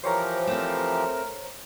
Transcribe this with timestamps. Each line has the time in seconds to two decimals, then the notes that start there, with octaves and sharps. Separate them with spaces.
0.04 E3 F3 G4 A#4 C5 C#5 A#5
0.47 A3 C4 A#4